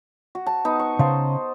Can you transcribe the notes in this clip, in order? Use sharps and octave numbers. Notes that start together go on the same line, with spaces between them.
F#4
A5
B3 D#4
C#6
C#3 C5 F5 A5